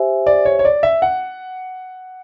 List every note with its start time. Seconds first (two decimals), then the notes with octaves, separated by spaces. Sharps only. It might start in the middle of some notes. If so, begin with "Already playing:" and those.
Already playing: G4 C5 E5 G#5
0.27 D5
0.45 C#5
0.59 C#5
0.65 D5
0.83 E5
1.02 F#5